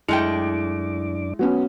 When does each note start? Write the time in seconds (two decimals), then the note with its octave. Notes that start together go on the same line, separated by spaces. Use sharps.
0.09 F#2 G#3 A3 D4 E4 G5 D6
1.39 F#3 B3 C#4 F#4